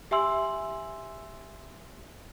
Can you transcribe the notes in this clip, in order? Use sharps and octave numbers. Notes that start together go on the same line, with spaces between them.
G4 E5 G#5 C6 E6 F#7